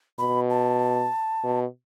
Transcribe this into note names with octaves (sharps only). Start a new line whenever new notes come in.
B2 B5
A5
B2